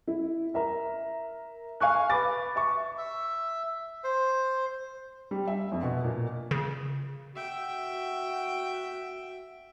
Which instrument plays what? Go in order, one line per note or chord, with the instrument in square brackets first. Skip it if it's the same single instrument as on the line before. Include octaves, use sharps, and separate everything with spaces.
[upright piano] E4
A#4 E5 A#5
F5 G#5 C#6 F#6
B4 B5 D6 A6
E5 C#6
[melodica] E5
C5
[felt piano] G3
E5
F2
B2
A#2
[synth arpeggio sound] C#3
[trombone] F#4 [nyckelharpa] E5 G5